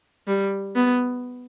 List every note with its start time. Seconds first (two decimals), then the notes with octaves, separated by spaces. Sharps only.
0.27 G3
0.75 B3